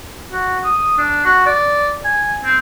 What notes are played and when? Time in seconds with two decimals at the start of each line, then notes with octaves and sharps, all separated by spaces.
0.32 F#4
0.64 D#6
0.98 D4
1.25 F#4
1.46 D5
2.05 G#5
2.45 C4